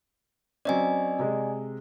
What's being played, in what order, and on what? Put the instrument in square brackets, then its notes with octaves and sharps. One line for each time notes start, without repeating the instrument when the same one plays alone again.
[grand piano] F#3 C4 C#4 [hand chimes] D5 D#5 G#5
[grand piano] C3 G#3